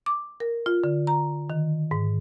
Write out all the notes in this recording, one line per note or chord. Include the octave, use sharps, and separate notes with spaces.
D6
A#4
F4
D3
A#5
D#3
G#2